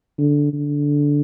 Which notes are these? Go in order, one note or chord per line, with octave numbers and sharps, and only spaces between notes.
D3
D3